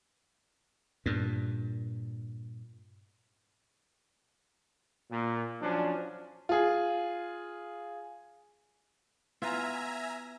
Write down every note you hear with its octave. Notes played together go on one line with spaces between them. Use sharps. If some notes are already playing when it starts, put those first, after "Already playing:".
G2 A#2
A#2
F3 F#3 C#4 D4
F4 G#4
B3 E4 F4 E5 G#5 A#5